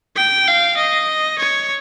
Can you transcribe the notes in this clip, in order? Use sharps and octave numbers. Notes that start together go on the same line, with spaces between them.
G5
F5
D#5
C#5